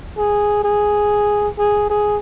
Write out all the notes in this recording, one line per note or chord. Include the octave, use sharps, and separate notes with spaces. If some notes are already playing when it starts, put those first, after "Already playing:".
G#4
G#4
G#4
G#4